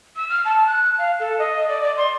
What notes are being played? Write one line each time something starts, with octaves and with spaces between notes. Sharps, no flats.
E6
F6
A5
F#6
F5
A4
D#5
D5
D5
C6